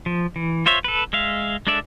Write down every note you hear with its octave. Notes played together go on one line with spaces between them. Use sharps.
F3
E3
F4 C5 C#5 E5
A4 B4
G#3 E5 F5
G#3 D4 A4 D5 E5